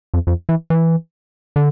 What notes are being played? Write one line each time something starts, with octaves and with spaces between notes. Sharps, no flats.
F2
F2
E3
E3
D3